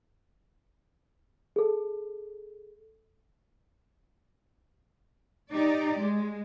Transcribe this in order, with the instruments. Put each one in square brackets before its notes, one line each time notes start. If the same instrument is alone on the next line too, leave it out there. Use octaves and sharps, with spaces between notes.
[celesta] G#4 A4
[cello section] D#4 G4 D5
G#3